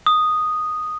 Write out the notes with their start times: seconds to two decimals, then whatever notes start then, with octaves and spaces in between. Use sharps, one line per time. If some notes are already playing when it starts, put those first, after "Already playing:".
0.06 D#6